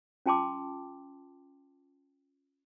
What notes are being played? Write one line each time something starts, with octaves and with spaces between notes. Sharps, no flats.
C#4 F4 G5 A5 C6 D6